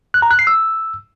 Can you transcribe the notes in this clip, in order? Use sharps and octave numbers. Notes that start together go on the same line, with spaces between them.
F#6
A#5
F#6
C7
E6